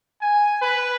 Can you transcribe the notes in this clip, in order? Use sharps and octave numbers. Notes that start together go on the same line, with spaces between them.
G#5
B4